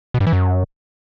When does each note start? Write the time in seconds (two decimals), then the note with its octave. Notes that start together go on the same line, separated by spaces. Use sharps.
0.14 B2
0.20 G2
0.27 E3
0.33 F#2